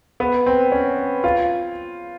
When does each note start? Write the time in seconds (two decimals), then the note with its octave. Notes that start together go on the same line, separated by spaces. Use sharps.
0.20 B3
0.46 C4
0.72 C#4
1.24 F4